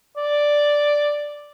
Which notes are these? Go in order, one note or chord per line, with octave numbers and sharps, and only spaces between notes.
D5